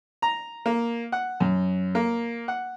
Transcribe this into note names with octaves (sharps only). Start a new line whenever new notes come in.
A#5
A#3
F#5
F#2
A#3
F#5